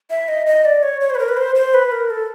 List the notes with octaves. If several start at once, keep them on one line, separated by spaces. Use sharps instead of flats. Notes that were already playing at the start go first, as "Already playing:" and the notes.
E5
D#5
D#5
D5
C#5
C#5
C5
B4
A#4
B4
C5
C5
B4
A#4
A4